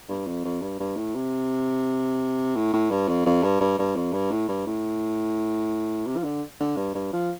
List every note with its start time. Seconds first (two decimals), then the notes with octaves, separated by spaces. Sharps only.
0.09 G2
0.27 F2
0.45 F2
0.62 G2
0.80 G2
0.96 A2
1.15 C3
2.56 A2
2.73 A2
2.91 G2
3.08 F2
3.26 F2
3.43 G2
3.60 G2
3.79 G2
3.96 F2
4.13 G2
4.31 A2
4.48 G2
4.67 A2
6.07 C3
6.17 F3
6.24 D3
6.60 D3
6.77 G2
6.95 G2
7.13 F3